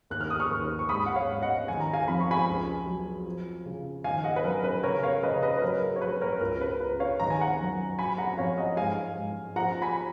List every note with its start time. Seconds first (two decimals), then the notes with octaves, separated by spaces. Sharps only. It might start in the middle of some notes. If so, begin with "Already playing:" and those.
0.10 D#2 F#6
0.21 F6
0.30 D#6
0.40 C#6 F6
0.50 D#2
0.79 C#6
0.89 G#2 B5 D#6
1.06 F#5
1.16 C#5 F5
1.28 G#2
1.42 D#5 F#5
1.68 D#3 G#5
1.80 A#5
1.93 F5 G#5
2.07 F2 B5
2.20 C#6
2.31 G#5 B5
2.47 C#2
2.86 F#3
3.25 F3
3.66 C#3
4.04 D#3 F5 G#5
4.24 D#5 F#5
4.36 B4
4.44 F#2 A#4
4.64 B4
4.83 C#3 A#4 C#5
5.03 C#5 F5
5.23 C#3 B4 D#5
5.42 B4 D#5
5.57 B4
5.62 F#3 A#4 C#5
5.82 A#4
5.96 C#5
6.01 F#3 B4
6.21 A#4 C#5
6.41 C#2 A#4
6.61 B4
6.80 C#2 B4
7.00 C#5 F5
7.20 D#3 A#5
7.30 G#5
7.41 F#5 A#5
7.60 F#2
7.98 F#3 G#5 B5
8.18 F#5 A#5
8.37 F2 C#5 F5
8.58 D#5 F#5
8.77 G#2 F5 G#5
9.17 G#2
9.56 F3 F#5 A#5
9.82 G#5 B5